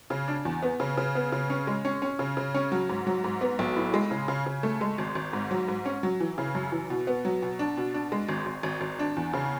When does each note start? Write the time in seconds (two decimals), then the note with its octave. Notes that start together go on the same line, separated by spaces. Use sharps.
0.10 C#3
0.28 D4
0.45 E2
0.63 B3
0.80 C#3
0.97 C#3
1.15 B3
1.32 C#3
1.50 C#4
1.67 G#3
1.85 C#4
2.02 C#4
2.19 C#3
2.37 C#3
2.54 C#4
2.72 F#3
2.89 G#2
3.07 F#3
3.24 G#2
3.41 B3
3.59 B1
3.76 A2
3.94 G#3
4.11 C#3
4.28 C#3
4.46 C#3
4.63 A3
4.81 G#3
4.98 G#1
5.15 G#1
5.33 G#2
5.51 F#3
5.68 G#2
5.86 C#4
6.03 F#3
6.20 E3
6.38 C#3
6.55 F#2
6.72 E3
6.90 B2
7.07 B3
7.25 F#3
7.42 B2
7.59 D4
7.77 B2
7.94 D4
8.12 G#3
8.29 G#1
8.46 G#1
8.63 G#1
8.81 G#1
8.99 D4
9.16 E2
9.33 C#3